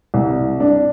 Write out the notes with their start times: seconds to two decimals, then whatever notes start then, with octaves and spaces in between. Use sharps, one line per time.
0.14 C2
0.60 D4